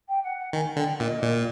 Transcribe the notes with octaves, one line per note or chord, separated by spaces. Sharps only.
G5
F#5
F#5
D#3 G#5
D3 G5
A#2 E5
D#5
A#2